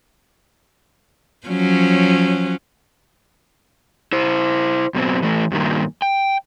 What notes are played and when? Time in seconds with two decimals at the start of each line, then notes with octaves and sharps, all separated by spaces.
1.47 F3 F#3 C#4
4.12 E4 C5
4.94 F#2 B2 C4
5.22 E3 A3
5.52 G2 A#2 D#3 A#3
6.02 G5